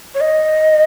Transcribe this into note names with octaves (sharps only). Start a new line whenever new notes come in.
C#5
D#5